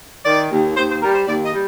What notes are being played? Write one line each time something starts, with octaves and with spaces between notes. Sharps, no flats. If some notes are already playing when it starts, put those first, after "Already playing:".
D#3 D5
D#2
D#2 C5
C5
G3 A#4
C5
D#2 D5
D#5
G3